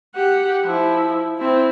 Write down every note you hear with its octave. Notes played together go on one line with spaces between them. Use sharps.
G4 F#5
F3 E4
C4 E4